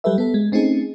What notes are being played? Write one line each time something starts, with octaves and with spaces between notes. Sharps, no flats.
F#3 G3 G4 A4 B4 E5
B3 A4
G#3
A3 C4 C#4 D#4 G#4